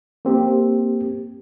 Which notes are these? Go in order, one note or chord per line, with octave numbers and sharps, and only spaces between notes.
A#3 C4 G4